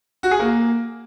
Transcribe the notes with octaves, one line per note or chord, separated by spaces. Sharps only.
F#4
G#4
A#3